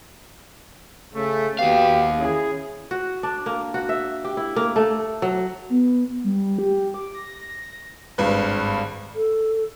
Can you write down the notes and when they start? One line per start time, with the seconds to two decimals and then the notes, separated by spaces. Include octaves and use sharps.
1.14 C#3 A3
1.59 D#2 B3 F#4 G4 F5
2.20 C#4 E4 G#4
2.91 F#4
3.23 D4
3.46 A#3
3.74 F#4
3.89 E5
4.24 G4
4.37 E4
4.56 A#3
4.76 A3
5.22 F#3
5.70 B3
6.24 G3
6.59 G4
6.94 D6
7.15 A#6
8.18 G#1 G2 B4 F#6
9.15 A4